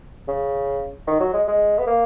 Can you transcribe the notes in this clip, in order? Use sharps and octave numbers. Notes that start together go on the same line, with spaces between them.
C#3
D#3
F#3
G#3
G#3
B3
A#3